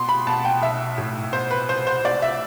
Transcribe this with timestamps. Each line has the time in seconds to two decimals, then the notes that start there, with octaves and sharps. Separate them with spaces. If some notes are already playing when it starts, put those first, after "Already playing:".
Already playing: B2 C6
0.09 B5
0.27 B2 A5
0.45 G5
0.62 B1 E5
0.98 A2
1.33 B2 C5
1.51 B4
1.69 C2 C5
1.87 C5
2.05 C2 D5
2.22 E5